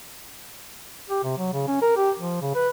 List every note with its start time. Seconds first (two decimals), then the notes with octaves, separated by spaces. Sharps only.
1.10 G4
1.24 C3
1.38 F#3
1.53 C#3
1.67 C#4
1.82 A#4
1.97 G4
2.19 F3
2.42 C#3
2.55 B4